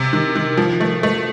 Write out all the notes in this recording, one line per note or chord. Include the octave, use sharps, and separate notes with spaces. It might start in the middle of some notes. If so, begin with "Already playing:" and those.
Already playing: C3
D#3
D#3
F3
A3
A3